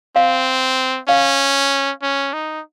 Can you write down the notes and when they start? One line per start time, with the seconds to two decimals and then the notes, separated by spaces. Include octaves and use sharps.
0.16 C4 F5
1.08 C#4 F5
2.02 C#4
2.33 D#4